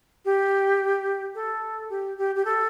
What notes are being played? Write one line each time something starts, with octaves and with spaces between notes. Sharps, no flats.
G4
A4
G4
G4
G4
A4